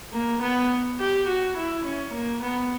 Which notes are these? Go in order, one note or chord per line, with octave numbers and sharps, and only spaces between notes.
A#3
B3
G4
F#4
E4
C#4
A#3
B3